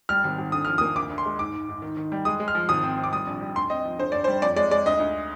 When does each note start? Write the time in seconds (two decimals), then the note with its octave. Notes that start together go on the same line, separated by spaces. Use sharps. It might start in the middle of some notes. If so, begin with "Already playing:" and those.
0.09 G3 F6
0.24 G#1
0.38 G#1
0.52 D3 D#6
0.65 F3 F6
0.78 D#6
0.81 A#3
0.96 D2 D6
1.10 D2
1.18 C6
1.26 G#3
1.39 G#2 D6
1.54 G#2
1.69 G#2
1.82 D#3
1.97 D#3
2.12 G3
2.25 G#3 D#6
2.40 G#3
2.48 F6
2.55 F3
2.69 G#1 D#6
2.83 C4
2.98 C4
3.04 D6
3.12 G3 D#6
3.27 A#1
3.41 G3
3.56 D2 C6
3.70 C4 D#5
3.85 F3
3.98 D3 C5
4.12 G2 D5
4.24 C5
4.28 G3
4.42 F2 D5
4.56 G#3 D5
4.71 G#3 D5
4.86 D2 D#5
5.00 D2